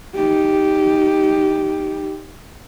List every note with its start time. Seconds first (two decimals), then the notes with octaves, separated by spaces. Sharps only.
0.15 D#4 G4